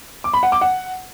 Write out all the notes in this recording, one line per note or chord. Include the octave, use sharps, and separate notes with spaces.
D6
B5
F#5
D6
F#5